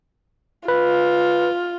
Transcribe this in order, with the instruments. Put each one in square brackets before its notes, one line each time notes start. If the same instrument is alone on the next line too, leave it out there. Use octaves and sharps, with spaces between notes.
[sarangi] F4 [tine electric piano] B4